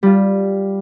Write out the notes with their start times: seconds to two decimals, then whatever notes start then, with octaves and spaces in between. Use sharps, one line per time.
0.03 G3 F4